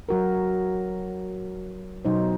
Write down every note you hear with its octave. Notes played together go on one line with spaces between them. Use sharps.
F#3 F#4 A#4
B2 F#3 D#4 C5